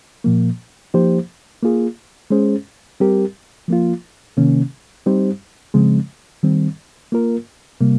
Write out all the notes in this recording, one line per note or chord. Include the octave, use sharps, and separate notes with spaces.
A#2 F3 A#3
F3 A#3 D#4 G4 C5
A#3 F4 G#4
G#3 C#4 G#4 C5
G3 C4 G4 A#4
F3 A#3 F4
C3 D#3 A#3 C#4
G3 C4 D#4 G4 C5
C#3 F3 G#3 C4
D#3 G3 C4
A#3 F4 A#4
C3 G3 A#3